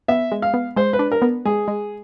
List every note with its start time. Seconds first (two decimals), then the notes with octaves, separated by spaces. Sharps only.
0.08 B3 E5
0.32 G#3
0.42 F5
0.54 B3
0.76 G#3 C5
0.93 B4
0.99 D4
1.12 A#4
1.22 B3
1.45 G#3 G#4
1.68 G#3